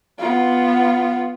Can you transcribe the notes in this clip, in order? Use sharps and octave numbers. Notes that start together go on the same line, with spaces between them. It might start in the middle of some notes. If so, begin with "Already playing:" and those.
B3 F4